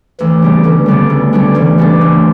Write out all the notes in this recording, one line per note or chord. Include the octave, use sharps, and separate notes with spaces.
D2 E3
C#3 G3 B3 D4
D2 D3
C#3 G3 B3 D4
D2
C#3 G3 B3 D4
D2 E3
C#3 G3 B3 D4
D2